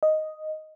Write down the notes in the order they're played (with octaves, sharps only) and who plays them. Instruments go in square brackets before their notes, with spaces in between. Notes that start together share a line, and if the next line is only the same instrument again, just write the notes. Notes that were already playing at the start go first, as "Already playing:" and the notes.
[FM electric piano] D#5